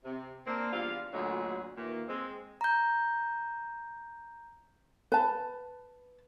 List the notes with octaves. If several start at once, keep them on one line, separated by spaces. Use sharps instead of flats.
C3
A#3 C4 D4
E2 G3 D4 F4 F5
D2 A#2 D3 F#3 G#3 G#4
D#2 A#2 E3 A#3
G#3 C4
A#5 G6
B4 A5